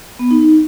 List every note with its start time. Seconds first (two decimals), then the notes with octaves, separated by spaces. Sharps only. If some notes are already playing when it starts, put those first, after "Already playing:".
0.19 B3
0.31 D#4
0.41 D#4